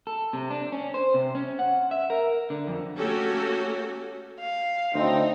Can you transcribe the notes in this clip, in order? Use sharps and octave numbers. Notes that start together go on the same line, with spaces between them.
A4
C3
D4
C#4
C5
C3
C#4
F#5
E5
A#4
D3
F2
A3 A#3 C#4 F#4 G4 A4
F5
D2 A2 C4 D#4